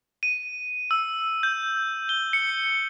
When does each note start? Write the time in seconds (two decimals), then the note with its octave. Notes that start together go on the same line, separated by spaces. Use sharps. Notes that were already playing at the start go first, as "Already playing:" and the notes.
0.23 D#7
0.91 E6
1.43 G6
2.09 G7
2.33 C#7